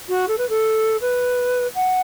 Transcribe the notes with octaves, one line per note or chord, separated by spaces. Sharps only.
F#4
A4
B4
A4
B4
F#5